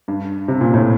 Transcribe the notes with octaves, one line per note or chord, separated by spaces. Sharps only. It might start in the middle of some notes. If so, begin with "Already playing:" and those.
G2
C3
A#2
A2